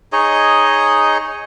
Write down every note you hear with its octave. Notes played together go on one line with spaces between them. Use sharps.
D#4 G#4 C#5 D#5